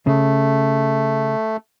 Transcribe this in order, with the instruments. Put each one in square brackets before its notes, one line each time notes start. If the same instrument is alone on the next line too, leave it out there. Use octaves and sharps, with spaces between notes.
[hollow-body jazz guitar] C#3 [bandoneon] A3